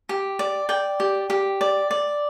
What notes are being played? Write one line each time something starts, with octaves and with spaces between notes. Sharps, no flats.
G4
D5
D5 G5
G4
G4
D5
D5